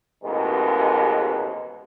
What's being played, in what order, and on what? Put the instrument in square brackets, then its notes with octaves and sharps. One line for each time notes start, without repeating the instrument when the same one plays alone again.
[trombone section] A1 D#2 G#2 B2 G#3